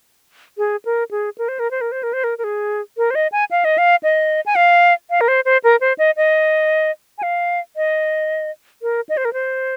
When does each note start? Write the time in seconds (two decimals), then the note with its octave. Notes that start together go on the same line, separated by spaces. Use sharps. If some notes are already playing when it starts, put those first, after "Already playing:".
0.58 G#4
0.85 A#4
1.11 G#4
1.38 A#4
1.48 C5
1.59 A#4
1.71 C5
1.81 A#4
1.92 C5
2.03 A#4
2.13 C5
2.24 A#4
2.38 A#4
2.44 G#4
2.97 A#4
3.11 C5
3.15 D#5
3.32 G#5
3.51 F5
3.65 D#5
3.78 F5
4.03 D#5
4.46 G#5
4.56 F5
5.10 F5
5.21 A#4
5.28 C5
5.45 C5
5.64 A#4
5.81 C5
5.98 D#5
6.17 D#5
7.18 G#5
7.23 F5
7.76 D#5
8.82 A#4
9.09 D#5
9.17 C5
9.25 A#4
9.33 C5